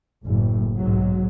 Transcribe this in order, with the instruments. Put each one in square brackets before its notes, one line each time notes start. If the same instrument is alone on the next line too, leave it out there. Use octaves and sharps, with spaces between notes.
[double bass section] F#1 A2
B1 G#2 F#3